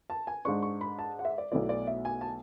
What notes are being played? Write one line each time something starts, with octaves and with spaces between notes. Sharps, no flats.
A5
G#5
G#2 G#3 D4 C#6
C#6
B5
A5
F#5
E5
D5
B1 B2 A3 E4 D5
D5
E5
G#5
A5